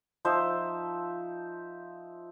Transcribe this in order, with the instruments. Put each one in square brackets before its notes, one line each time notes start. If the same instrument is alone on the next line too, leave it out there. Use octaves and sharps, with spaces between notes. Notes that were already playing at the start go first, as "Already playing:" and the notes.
[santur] F3 D#4 C5 E5